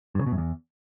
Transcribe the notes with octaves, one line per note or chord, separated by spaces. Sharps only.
G2
C#3
B2
F#2
E2